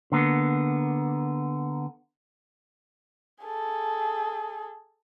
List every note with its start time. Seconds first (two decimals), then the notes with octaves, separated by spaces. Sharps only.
0.12 D3 A#3 B3
3.44 G#4 A4